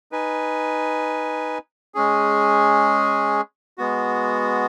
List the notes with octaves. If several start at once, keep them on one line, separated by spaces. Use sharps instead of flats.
D#4 B4 G#5
G#3 C#4 G#4
G#3 B3 F#4